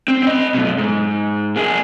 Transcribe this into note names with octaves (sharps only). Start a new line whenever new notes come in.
C4
C4 D#5
F#2 B2
G#2
A#3 G#4